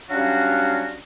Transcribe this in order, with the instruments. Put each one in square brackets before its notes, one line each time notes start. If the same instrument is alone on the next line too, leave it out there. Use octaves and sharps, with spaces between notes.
[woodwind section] F#3 G3 C#4 D4 F#4 F5